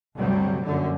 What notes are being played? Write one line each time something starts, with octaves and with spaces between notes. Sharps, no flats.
D2 G2 C3 F#3 G3
A#1 F#2 D3